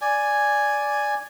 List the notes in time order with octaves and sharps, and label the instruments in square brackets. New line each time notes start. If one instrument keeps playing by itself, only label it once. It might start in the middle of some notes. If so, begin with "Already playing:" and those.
[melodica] D5 G#5